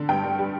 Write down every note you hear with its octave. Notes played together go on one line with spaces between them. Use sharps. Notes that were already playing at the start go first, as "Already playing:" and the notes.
Already playing: D3
G2 G5
G2
G3